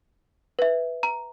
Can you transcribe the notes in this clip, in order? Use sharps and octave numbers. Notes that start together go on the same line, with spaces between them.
B4 E5
A#5